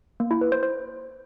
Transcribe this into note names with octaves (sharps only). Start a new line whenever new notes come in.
A#3
E4
B4
C5
C5